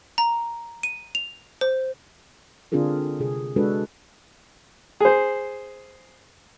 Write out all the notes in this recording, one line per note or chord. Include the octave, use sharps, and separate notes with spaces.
A#5
D#7
F7
C5
D3 C4 D4 F4 G#4 A#4
C3 G#4
G#3 D4 F#4 A4 B4
G#4 C5